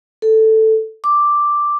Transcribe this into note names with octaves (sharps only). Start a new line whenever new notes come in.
A4
D6